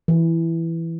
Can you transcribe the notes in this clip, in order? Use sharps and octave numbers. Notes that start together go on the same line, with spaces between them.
E3